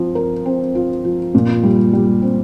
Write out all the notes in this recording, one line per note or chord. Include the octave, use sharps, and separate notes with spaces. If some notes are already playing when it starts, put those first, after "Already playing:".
Already playing: F3 C4
A#4
C4
F4
F3
A#2
G3
G3
C4